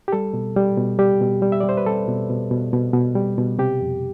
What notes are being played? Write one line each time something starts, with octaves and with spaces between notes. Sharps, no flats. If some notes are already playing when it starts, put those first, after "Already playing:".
G4
G3 A4
B2
G3
B2
G3 G4
B2
G3
E5
G3 D5
C5
B4
G3 A4
B2
B2
B2
B2
B2
G3
B2
C3 G4
F2